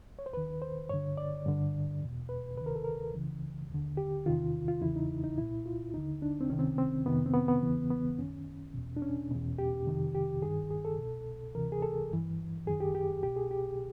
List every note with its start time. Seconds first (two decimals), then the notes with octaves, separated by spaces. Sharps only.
0.19 C#5
0.26 C5
0.33 D#2 D#3 B4
0.62 C5
0.89 G2 D3 C#5
1.17 D5
1.46 G2 D3
2.01 E2 B2
2.29 B4
2.57 D2 C3 D#3 B4
2.66 A#4
2.75 A4
2.84 A#4
3.13 C#2 C#3 E3
3.70 D#2 D3
3.97 G4
4.26 E2 C3 D#3 F4
4.68 F4
4.81 E2 C#3 E3 E4
4.96 D#4
5.24 D#4
5.37 C2 A#2 E4
5.66 F4
5.94 D#2 D3 D#4
6.22 D4
6.41 C4
6.50 C#2 C3 D#3 C#4
6.59 C4
6.78 C4
7.05 F2 C3 D#3 B3
7.26 C4
7.34 B3
7.48 B3
7.62 E2 C#3 E3
7.90 B3
8.18 F#2 D#3 C#4
8.74 E2 B2
8.97 D4
9.02 C#4
9.30 E2 B2
9.59 G4
9.87 F2 C3 D#3
10.15 G4
10.42 G2 D#3 G#4
10.71 G#4
10.85 A4
10.98 C2 B2
11.55 D2 C3 E3 A#4
11.72 G#4
11.82 A4
12.11 G2 E3
12.66 F#2 D#3 G#4
12.80 G4
12.95 G4
13.22 C2 B2 G4
13.36 G#4
13.51 G4